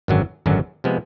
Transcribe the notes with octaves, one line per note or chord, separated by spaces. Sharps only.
G#1 F#2 D3 F#3
G#1 F#2 D3 F#3
C3 F3 G#3 B3